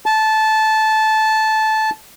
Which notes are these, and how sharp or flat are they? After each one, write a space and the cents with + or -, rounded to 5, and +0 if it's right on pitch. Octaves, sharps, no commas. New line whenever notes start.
A5 -15